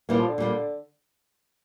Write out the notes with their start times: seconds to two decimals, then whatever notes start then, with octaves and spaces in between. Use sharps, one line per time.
0.09 A#2 E3 G3 A#3
0.19 F3
0.28 D3
0.38 A#2 G3 A#3